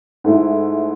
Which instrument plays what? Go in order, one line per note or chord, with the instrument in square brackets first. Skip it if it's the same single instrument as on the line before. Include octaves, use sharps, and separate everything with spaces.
[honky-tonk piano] G#2 A3 E4